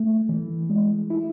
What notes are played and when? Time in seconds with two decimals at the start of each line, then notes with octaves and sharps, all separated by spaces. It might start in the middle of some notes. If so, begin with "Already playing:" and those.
Already playing: A3
0.29 E3
0.70 G#3
1.10 E4